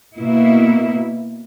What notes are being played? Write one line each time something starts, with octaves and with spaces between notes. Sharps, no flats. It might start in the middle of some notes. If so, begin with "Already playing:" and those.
B2 A#3 E4